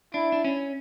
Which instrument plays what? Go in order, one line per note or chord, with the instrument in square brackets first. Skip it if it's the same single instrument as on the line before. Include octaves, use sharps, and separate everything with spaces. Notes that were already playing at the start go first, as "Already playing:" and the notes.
[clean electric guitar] D4 [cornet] E4
[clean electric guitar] D4
C#4